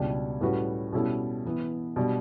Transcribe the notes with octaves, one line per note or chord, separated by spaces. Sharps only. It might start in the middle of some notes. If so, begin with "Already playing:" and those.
Already playing: C#2 B2 G3 D4 G4
A2 G3 C#4 F#4 B4
B2 G3 C#4 E4 A4
E3 B3 E4
B2 G3 D4